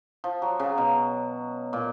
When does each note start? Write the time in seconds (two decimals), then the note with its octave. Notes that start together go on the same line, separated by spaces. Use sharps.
0.24 F3
0.42 F#3
0.59 C#3
0.78 B2
1.73 A#2